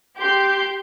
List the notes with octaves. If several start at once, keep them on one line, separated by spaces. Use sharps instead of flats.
G4 C6 G6